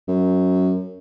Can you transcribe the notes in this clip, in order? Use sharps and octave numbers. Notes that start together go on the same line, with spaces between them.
F#2